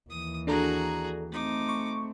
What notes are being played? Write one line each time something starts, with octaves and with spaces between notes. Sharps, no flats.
D#2 E3 D#6
D4 F#4 G#4 A4 A#5
A3 C4 D#4 D6
C#6